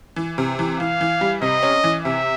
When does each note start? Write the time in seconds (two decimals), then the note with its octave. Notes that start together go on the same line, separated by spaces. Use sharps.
0.16 E3
0.38 C3
0.59 E3
0.79 E3 F5
1.01 E3
1.21 G3
1.42 C3 D#5
1.63 C#4
1.84 E3
2.05 C3 E5